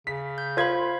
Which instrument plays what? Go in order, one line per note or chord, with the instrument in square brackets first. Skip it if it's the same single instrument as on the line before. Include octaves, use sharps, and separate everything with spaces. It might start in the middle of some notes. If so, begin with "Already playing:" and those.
[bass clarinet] C#3 [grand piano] B6
[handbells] G6
[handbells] F4 F5 B5 [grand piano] C5 G#6